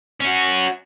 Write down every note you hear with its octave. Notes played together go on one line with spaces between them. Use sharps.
C#4 F#4